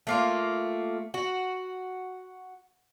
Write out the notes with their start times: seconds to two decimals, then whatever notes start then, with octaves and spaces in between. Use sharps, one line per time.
0.07 A3 A#3 F4
1.14 F#4